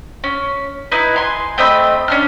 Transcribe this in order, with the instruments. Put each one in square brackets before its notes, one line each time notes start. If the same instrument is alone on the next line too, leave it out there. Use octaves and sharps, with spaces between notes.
[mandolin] C#4
D#4 E4 B4
G#5 C6
A3 C4 D#5 B5
C#4 D4 F6